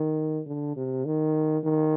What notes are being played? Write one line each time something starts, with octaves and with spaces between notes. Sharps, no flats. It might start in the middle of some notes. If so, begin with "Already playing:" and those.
Already playing: D#3
D3
C3
D#3
D#3